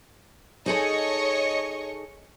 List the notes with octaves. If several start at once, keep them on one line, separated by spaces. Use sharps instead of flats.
D#4 G#4 A4 C#5 D#5 C#6